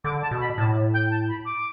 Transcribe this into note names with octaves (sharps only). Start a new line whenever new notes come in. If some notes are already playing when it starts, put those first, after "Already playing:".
D3 D6
A5
B2
B5
A2 A5
G5
A5
B5
D6